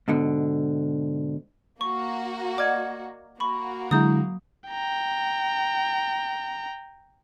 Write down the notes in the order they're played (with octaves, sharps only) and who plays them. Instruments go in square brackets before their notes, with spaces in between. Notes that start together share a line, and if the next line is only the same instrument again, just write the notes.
[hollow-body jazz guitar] G#2 B2 D3
[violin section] A#3 F#4 [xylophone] C#6
[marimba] D5 D#5 F#5 [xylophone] D6 F6 G#6
[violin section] A#3 F#4 [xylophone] B5 C#6
[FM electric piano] D3 G#3 E4 [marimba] F#3 A#5 G6 [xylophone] D#6
[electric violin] G5 A#5